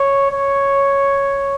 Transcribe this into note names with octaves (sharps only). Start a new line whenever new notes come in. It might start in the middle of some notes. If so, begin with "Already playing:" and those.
Already playing: C#5
C#5